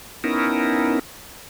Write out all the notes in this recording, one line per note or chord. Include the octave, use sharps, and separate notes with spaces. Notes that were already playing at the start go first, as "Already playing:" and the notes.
B3 C#4 D#4 E4 A#4